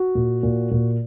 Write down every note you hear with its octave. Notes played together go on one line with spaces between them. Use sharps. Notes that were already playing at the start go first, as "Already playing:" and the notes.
Already playing: F#4
A#2
A#2
A#2